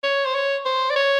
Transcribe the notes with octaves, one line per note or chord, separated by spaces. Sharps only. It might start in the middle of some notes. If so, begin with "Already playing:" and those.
C#5
C5
C#5
C5
D5
C#5